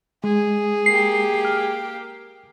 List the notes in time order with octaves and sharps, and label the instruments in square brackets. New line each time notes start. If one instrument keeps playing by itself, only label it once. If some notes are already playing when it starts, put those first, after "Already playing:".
[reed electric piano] G#3 [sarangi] G#4
[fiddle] A#3 G4 [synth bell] C7
[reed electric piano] F6